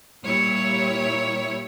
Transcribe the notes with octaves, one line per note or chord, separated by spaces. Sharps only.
A#2 G3 E4 C#5